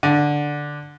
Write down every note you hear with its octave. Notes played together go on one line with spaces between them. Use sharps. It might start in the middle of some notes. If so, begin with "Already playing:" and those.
D3